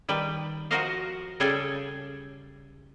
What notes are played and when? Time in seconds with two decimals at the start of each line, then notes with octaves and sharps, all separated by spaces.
0.09 D#3 G3 B4 G5
0.71 F3 F#4 A#4 C5 D#5 F5
1.40 C#3 G3 G#4 A4 G5 G#5